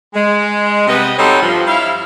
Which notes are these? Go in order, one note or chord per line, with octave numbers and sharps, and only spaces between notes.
G#3
C3 G3 B3 B4 D#5
G3 C4 D#4 F#4 A4 C#5
G2 F3
E4 F5